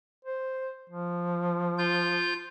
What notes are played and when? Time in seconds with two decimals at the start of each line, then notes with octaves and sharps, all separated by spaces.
0.25 C5
0.90 F3
1.78 F4 G6